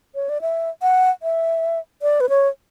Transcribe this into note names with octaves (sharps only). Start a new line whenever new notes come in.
C#5
D5
E5
F#5
E5
D5
B4
C#5